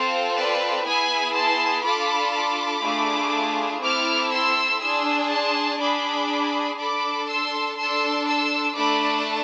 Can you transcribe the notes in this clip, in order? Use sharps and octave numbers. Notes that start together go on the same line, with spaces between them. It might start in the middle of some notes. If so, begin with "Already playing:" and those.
Already playing: C4 F4 A4 C5
B4 D5
B3 E4 G#4 G#5 B5
A5 C6
D4 F4 A4 B5 D6
B5 D6
A3 D4 F4 G#4
C4 E4 A4 D6 F6
C6 E6
D4 G#4 C6 E6
A5 C6
D4 G#4 B5 D6
D4 A4 B5 D6
C6 E6
D4 A4 C6 E6
C6 E6
A3 D4 A4 B5 D6